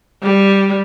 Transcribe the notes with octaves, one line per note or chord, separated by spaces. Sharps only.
G3